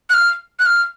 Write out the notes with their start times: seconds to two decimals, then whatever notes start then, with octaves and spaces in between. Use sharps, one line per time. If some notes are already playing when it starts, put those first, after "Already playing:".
0.10 F#6
0.14 F6
0.59 F#6
0.66 F6